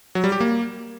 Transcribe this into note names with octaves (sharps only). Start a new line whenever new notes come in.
F#3
G3
G4
A#3